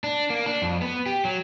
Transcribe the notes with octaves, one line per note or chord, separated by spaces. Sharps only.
D4
A#3
D4
F2
B3
G4
F#3